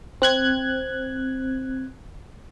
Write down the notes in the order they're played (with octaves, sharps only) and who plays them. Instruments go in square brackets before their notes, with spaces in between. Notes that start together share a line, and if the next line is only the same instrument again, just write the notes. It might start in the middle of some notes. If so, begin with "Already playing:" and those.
[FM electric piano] C4 F#6 G#6